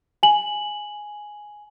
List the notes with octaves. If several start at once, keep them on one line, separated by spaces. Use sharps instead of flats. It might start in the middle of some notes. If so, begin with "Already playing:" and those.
G#5 F#7